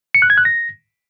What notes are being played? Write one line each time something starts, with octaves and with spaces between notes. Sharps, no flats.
C#7
F#6
G#6
F#6
A#6